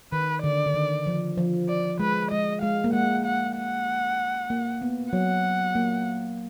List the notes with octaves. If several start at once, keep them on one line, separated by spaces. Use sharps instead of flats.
D#3 B4
D3 D5
D3
D#3
F3
F3
D5
G#3 B4
G#3 D#5
G#3 F5
A#3
G#3 F#5
F#5
F#5
A#3
B3
F#3 F#5
A#3